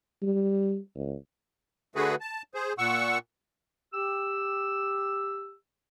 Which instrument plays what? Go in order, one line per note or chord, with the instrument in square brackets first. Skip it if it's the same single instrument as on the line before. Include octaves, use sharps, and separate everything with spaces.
[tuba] G3
C#2
[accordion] D3 A3 F#4 G#4 B4
A5
G#4 C5
A#2 F#5 C#6 E6
[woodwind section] G4 E6